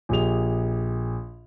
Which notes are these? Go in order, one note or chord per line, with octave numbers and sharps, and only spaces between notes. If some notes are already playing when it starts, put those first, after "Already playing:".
A#1 G4 G#4 F7